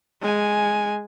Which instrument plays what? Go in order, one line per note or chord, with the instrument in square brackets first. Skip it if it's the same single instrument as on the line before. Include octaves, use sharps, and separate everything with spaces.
[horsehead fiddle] G#3 G#5